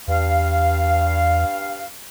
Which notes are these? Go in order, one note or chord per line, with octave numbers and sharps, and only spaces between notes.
E2 G2 F5